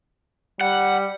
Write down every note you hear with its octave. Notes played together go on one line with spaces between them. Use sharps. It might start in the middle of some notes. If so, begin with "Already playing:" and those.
G3 F#5